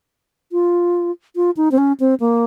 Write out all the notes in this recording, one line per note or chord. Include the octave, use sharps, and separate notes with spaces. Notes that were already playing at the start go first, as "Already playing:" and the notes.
F4
F4
D#4
C4
C#4
C4
A#3